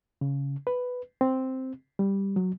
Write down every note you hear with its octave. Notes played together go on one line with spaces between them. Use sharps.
C#3
B4
C4
G3
F#3